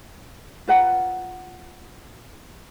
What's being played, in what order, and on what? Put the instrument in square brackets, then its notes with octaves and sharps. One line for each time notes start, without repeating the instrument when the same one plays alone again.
[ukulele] F4 B4 F#5 A#5